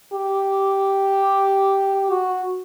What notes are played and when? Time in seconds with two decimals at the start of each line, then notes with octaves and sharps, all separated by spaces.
0.13 G4
2.10 F#4